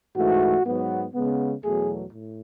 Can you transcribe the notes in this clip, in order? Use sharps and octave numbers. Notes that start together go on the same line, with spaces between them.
G#2 E3 A3 F#4
G#2 F#3 B3
C#3 G#3 B3
E2 B2 F#3 A3 G#4
A2